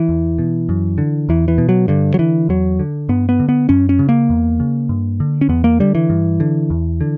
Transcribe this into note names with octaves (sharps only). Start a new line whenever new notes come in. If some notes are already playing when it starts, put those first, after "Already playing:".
Already playing: E3
E2
B2
F#2
D3
E2 E3
E3
B2
F#3
G2 D3
F#3
D3 E3
E2 F#3
D3
G2 B3
B3
D3
B3
F#2 C#4
C#4
C#3
A#3
E2
C#3
G2
D3
C#4
E2 B3
A#3
D3 G3
E3
G2
D3
E2
D3